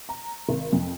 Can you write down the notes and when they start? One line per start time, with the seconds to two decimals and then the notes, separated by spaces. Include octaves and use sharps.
0.09 A#5
0.49 G#1
0.73 F2